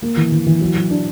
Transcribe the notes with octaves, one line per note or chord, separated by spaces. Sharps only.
A#3
E3
E3
E3
F#3
F#3
D4